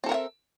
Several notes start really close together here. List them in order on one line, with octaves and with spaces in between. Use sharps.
C4 A4 A#4 F#5 E5